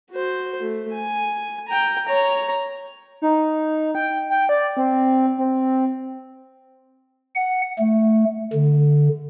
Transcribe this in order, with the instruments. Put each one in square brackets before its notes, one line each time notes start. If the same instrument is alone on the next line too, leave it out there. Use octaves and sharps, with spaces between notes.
[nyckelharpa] F#4 C5
A3
G#5
G5 A#5
C#5 A#5
[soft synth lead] D#4
G5
G5
D5
C4
C4
[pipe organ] F#5
A3
D3